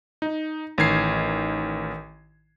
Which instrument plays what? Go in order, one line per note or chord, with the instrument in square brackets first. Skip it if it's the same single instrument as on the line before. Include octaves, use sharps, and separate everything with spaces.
[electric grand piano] D#4
A1 D#3 G#6 C7